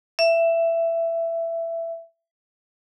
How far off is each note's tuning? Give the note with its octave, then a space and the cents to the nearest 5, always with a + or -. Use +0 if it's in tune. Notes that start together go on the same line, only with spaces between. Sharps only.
E5 +15